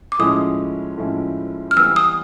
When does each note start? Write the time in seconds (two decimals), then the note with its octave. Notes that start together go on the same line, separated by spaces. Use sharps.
0.12 D6
0.19 A2 F3 G#3 C#4 E4 D#6
0.98 A2 F3 G#3 C#4 E4
1.71 F6
1.76 E3 G3 B3 E6
1.96 D#6